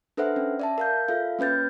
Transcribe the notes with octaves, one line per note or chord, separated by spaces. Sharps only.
D4 A4 B4 C5 E5 F#5
C#4
D5 E5 A5
A#4 F5 G6
F4 A4 E5 F5
A#3 C#4 B4 G6 A6